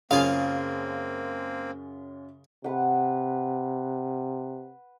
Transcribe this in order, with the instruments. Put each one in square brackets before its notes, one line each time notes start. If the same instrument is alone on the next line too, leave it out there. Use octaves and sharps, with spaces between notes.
[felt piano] F#2 C#4 [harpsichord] C#3 F4 G#4 [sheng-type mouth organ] A#3 C4 [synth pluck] F5
[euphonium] C3 [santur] B4 F#5